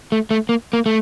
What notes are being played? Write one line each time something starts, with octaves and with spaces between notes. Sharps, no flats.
A3
A3
A#3
A#3
A3